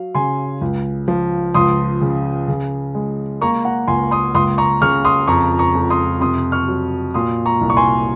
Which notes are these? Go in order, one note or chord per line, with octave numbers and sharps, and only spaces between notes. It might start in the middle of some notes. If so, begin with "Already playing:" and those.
Already playing: F#3 F5
C#3 G#5 C6
C#2
F3
C#2 C6 D#6
C#3
C#3
G#3
A#3 A#5 C#6
F#5 A#5
C#2 G#5 C6
C6 D#6
C#2 C6 D#6
A#5 C#6
C#3 C#6 F6
C6 D#6
F2 A#5 C#6
A#5 C#6
F2
C6 D#6
C3 C6 D#6
C#6 F6
F#3
A#2 C6 D#6
A#5 C#6
C2
C#6
G#5 C6